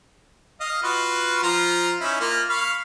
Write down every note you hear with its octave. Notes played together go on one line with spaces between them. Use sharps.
D#5 F5
F4 F#4 B4
F3 F4 A#5
C#4 D#4 E4
A#3 F4
F5 B5 C#6